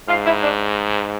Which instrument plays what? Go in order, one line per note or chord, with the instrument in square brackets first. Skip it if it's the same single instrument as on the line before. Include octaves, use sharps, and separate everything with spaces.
[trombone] G#2 [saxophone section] F4
[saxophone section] E4
D4